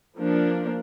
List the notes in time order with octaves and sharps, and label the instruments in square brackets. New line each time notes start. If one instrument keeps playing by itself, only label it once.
[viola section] F3 A#3 D4